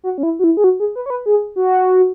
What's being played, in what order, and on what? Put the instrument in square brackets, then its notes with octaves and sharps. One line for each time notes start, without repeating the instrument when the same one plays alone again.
[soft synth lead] F#4
C#4
E4
F#4
E4
G#4
F#4
G#4
B4
C#5
B4
G#4
F#4